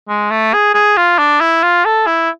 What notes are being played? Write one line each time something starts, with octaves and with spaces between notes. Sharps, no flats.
G#3
A3
G#4
G#4
F4
D4
E4
F4
A4
E4